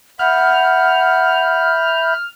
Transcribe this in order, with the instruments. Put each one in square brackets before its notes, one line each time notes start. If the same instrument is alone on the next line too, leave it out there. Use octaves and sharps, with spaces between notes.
[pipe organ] E5 B5 G6 [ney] F#5 [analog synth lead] F6